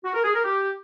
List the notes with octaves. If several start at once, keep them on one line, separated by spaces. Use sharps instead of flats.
F#4
A#4
G#4
A#4
G4